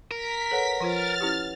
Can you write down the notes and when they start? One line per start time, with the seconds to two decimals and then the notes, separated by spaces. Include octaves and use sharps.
0.11 A#4 B6
0.51 A4 B4 C#5 F#5
0.80 F3 F4 C5 F6 A6
1.21 C#4 E4 G4